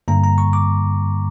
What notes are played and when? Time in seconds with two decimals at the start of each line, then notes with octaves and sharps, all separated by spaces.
0.08 G2 D3 G3 A#3 A#5
0.24 A#5
0.38 C#6
0.53 D6